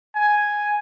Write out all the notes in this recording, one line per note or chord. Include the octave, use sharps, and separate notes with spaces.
G#5